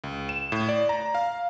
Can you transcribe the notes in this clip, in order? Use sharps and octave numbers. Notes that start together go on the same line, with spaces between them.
C#2
E7
A2
D5
A#5
F5